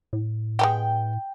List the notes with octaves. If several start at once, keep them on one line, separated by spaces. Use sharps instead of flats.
A2
G#3 B3 G4 G5